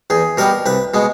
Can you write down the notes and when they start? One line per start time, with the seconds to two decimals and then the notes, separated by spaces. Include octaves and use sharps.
0.10 E2 G#4
0.37 B2 G3 B3 A#4
0.66 C2 B4
0.94 B2 G#3 B3